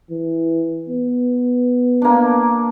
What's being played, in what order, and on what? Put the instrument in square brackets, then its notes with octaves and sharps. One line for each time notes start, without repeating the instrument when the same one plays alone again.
[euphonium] E3
B3
[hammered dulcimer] A#3 D4